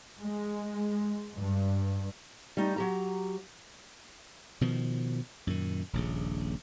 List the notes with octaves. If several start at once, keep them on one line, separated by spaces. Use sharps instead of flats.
G#3
G2
G3 A3 D#4
F#3 G4 A#5
B2 D#3 F3
F#2 A#2 D#3
D#1 A#1 C#3